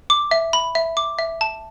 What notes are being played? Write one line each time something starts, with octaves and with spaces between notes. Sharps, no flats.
D6
E5
B5
E5
D6
E5
A5